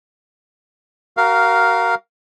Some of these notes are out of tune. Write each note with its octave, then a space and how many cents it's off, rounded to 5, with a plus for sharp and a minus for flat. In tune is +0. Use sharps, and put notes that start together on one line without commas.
F#4 +30 A#4 +0 F5 +0